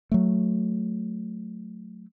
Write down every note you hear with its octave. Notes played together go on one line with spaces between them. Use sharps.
F#3 A3